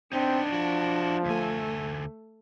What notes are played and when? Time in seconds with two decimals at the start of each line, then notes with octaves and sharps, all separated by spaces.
0.13 B3 C4 D4 D#4
0.52 F3 E4 F#4
1.26 D2 A3 G#5